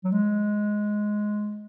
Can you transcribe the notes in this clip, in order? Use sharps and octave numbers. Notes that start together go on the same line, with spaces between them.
F#3
G#3